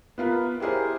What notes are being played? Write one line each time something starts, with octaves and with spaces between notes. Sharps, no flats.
B3 F4 A#4 B4
E4 G4 G#4 A#4 C5